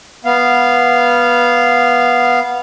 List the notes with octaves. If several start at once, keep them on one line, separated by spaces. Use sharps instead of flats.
B3 F5